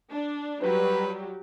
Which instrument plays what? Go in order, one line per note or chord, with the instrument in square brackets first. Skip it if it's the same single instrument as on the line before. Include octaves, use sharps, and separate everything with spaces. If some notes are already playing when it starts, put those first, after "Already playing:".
[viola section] D4
[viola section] F#3 G3 G4 [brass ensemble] B4